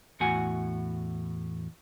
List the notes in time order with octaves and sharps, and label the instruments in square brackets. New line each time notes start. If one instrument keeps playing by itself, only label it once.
[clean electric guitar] E2 A2 F#4 F#5 G#5